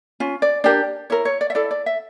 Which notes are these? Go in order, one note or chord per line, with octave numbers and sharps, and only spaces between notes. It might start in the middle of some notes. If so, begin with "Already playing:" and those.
C#4 F4
D5
D4 G4 A#4 D5
E4 A#4 C#5
C#5
D5
E5
E4 A4 D5
D5
E5